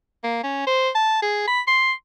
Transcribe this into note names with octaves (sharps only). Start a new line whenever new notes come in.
A#3
C#4
C5
A5
G#4
B5
C6